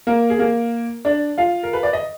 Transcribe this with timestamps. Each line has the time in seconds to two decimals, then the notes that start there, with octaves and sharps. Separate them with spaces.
0.07 A#3 A#4
0.30 G#4
0.39 A#3 A#4
1.05 D4 D5
1.38 F4 F5
1.63 A#4
1.73 B4
1.83 D5
1.93 D#5